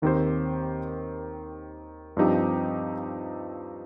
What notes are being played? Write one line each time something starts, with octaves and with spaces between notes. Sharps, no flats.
D#2 D#3 C4 G4 C5
G2 F3 C4 D#4 G4